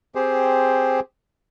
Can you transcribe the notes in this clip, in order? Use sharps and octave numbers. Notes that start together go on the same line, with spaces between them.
C4 G4 G#4 C5